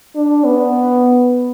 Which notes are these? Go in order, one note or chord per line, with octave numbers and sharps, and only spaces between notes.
D4
B3